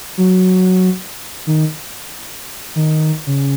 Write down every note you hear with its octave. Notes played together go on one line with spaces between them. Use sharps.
F#3
D#3
D#3
C#3